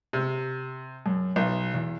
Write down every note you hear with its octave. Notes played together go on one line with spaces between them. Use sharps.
C3
F#2
B1
E2